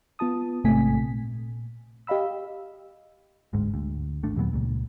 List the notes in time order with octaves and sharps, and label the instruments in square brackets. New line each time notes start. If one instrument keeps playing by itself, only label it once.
[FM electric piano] B3 F4 A5 D#6
A1 G#2 C3 A3 G#5 B6
A#2
G4 D#5 F5 B5 E6
[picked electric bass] G1 D2 G#2 G#3
D2
G#1 A3 D4
D#2 A#2 F#3 B3
C#2 A#2